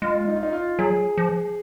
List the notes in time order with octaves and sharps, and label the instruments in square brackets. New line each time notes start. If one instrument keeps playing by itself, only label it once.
[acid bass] G#3 [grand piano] F4
[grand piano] D#4
F4
D#4
F4
[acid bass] F#3 [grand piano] G#4
[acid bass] F3